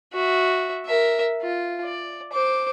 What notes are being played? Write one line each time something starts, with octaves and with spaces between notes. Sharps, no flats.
F#4 E5
A#4 E5
F4
D5
C5 D6